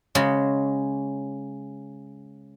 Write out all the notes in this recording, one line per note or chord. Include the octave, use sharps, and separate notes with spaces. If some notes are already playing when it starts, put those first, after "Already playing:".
C#3 G#3 F#4